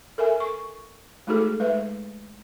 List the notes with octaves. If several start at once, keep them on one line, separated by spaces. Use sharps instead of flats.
A4 A#4 E5 G#5
C#6
G#3 A3 D#4 F#4 G#4 A4
G#3 B4 E5